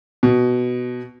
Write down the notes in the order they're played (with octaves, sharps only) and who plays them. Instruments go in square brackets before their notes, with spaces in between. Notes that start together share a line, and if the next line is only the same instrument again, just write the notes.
[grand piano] B2